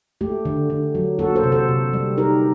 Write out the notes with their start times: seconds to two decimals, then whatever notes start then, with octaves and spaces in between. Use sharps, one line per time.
0.21 A3 G4
0.45 D3
0.70 D3
0.95 F#3
1.19 A#3 F#4 A4
1.36 A4 C5
1.43 C3
1.52 A4 C5
1.69 C3
1.93 G3
2.17 D#4 G4 A#4